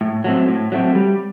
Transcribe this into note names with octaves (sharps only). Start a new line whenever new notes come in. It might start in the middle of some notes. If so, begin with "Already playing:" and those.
A2
F#3 A3 C4
A2
F#3 A3 C4
G3